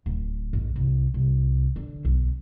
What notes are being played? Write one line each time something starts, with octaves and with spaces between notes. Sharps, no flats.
D1
A1
C2
C2
D3
B1